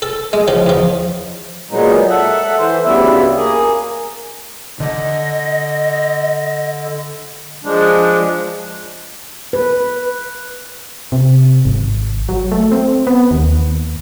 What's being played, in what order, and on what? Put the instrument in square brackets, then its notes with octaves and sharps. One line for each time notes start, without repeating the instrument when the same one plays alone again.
[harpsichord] A4
G#3
C#3 F3
E2 F3
[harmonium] A#2 F#3 G#3 B3 D#4
A4 E5 F#5
E3 C5
D2 C#3 G3 B3 E4 E5
A#3 G#4
[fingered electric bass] D3 [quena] D#5
[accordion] F3 G#3 D4
[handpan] B4
[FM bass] C3
G#1
F#3
A3
C4
B3
D#2